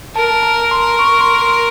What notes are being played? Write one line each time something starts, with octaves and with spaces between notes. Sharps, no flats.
A#4 A5
A#5
C6
C#6
C6
C6